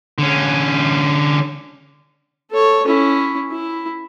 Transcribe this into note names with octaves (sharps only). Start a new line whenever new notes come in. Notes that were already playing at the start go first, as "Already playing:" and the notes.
D3 C#4
A4 C#5
C#4 E4
E4